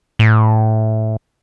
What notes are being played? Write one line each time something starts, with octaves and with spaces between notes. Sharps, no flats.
A2